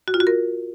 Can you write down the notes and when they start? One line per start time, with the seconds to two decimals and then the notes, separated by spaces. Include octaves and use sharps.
0.08 F#4
0.14 F4
0.20 F#4
0.27 A#4